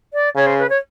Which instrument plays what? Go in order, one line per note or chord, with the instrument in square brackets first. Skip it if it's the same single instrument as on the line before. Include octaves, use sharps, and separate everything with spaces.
[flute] D5
[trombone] C#3 [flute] C#5
[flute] C5
B4
C#5